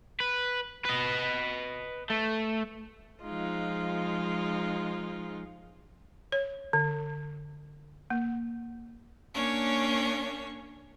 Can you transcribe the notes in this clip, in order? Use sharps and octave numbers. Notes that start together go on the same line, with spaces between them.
B4
B4 D#5
A3
F3 G#3 D#4 F4
C#5
D3
A#3
A#3 C#4 D4 C#5